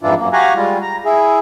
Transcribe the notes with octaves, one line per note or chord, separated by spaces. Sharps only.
F2 G#2 E3 D4 E4 F4
F#2 A#3
F#4 G4 F5 F#5 G#5 A#5
G3 G#3 F4
A#5
E4 G#4